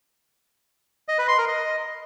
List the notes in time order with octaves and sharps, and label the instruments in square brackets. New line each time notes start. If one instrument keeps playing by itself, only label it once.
[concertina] D#5
B4
C6
A#4
D#5